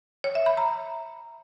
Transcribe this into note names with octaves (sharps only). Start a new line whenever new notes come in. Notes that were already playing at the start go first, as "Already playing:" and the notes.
C#5
E5
B5
A#5